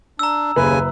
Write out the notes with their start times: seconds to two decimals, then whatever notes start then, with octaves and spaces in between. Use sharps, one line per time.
0.19 D4 A#5 E6
0.56 F#1 D#2 C#3 B4 G#5